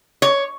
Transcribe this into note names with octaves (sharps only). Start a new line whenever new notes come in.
C#5